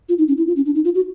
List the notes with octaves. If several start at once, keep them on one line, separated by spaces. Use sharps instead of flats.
F4
D#4
C#4
E4
F4
C#4
D4
D#4
F4
F#4